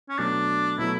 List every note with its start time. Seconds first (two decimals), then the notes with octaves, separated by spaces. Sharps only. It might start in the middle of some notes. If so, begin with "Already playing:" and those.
0.09 C#4
0.19 B2 F#3 A3 D4
0.78 B2 F#3 A3 E4